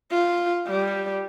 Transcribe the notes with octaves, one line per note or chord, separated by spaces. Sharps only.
F4
G3